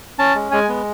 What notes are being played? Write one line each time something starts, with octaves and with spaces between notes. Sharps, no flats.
C#4 A5
G#3
G#3 G#5
B3